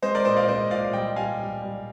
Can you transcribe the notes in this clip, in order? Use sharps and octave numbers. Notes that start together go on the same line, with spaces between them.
G#3 C5 D#5
A#4 D5
A#2 C5 D#5
D5 F5
G#3 C5 D#5
A#2 D5 F5
F5
G3 D#5 G5
G3 F5 G#5
G3
G3